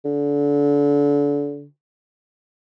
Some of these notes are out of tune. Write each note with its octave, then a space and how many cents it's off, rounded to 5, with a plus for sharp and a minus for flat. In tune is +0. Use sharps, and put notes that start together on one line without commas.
D3 -30